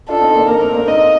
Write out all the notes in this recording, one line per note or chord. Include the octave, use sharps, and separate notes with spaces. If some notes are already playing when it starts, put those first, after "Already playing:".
D4 F4 A4
C4 D#4
A#3 D4
A#3 A#4
A3 C4
A#3 D4
C4 D#4 D#5